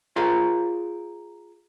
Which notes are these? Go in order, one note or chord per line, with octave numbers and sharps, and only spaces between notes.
F4 G#4 A#4 C5 F5